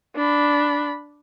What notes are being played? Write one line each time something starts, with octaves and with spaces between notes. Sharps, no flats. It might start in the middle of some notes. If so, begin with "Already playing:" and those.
D4 B5